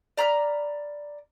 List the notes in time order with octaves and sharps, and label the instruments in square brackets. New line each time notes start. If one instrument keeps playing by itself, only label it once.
[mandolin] D5 A#5 B5 F6